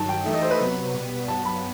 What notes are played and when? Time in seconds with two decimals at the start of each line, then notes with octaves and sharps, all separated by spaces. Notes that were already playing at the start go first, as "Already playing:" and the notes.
Already playing: G2 D#3 F#3 A5
0.09 G5
0.26 E3 A3 D#4 A4 E5
0.34 D#5
0.42 C5
0.51 B4
0.60 C3 F#3 B3
0.94 B2 G3 B3
1.27 G2 F#3 B3 A5
1.45 B5